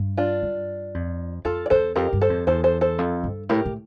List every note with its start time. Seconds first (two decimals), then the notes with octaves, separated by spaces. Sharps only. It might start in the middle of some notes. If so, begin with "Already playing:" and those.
Already playing: G2
0.17 D4 F4
0.43 G2
0.94 F2
1.45 F2 F4 A4
1.66 D5
1.70 E2 A4 C5
1.96 F2 G4 A#4
2.13 G2
2.21 A4 C5
2.30 F2
2.47 E2 A4 C5
2.64 A4 C5
2.81 A4 C5
2.98 F2
3.24 G2
3.49 A2 G4 A#4
3.66 A2